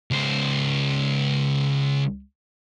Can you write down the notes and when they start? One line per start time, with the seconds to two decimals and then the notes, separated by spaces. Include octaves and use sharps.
0.11 C#2 C5